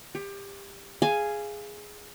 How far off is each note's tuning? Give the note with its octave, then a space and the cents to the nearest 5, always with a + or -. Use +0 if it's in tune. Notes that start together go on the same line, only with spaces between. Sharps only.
G4 +25 C#5 +0
G#4 +0 F5 -15 G#5 +0